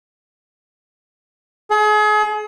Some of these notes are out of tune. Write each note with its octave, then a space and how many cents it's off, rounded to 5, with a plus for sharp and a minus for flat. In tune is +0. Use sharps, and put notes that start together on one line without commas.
G#4 +35